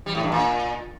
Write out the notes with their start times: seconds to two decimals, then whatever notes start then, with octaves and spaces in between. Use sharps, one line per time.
0.06 G3
0.15 A2
0.23 G2
0.32 A#2